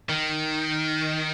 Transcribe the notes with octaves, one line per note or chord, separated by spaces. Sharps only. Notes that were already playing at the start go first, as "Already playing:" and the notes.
D#3